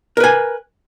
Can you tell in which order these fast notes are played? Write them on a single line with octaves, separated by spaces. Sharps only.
A#4 B4 G#5